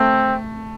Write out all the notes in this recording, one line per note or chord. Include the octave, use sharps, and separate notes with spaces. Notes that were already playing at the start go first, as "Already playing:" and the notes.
Already playing: A3 C4